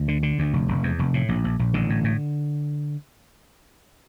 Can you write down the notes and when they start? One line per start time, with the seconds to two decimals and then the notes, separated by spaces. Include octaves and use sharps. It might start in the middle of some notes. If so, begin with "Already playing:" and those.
Already playing: D2
0.08 D3
0.23 D3
0.39 D2
0.53 F1
0.68 F1
0.83 E2
0.99 F1
1.14 A2
1.29 A#1
1.44 A#1
1.59 A#1
1.74 A1 D3
1.90 A2
2.04 A2